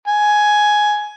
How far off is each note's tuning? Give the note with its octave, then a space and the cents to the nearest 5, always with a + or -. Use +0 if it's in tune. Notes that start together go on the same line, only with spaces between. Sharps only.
G#5 +10